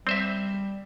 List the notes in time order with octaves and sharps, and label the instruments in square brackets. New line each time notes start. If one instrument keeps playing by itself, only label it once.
[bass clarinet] G3 [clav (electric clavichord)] C4 C5 E5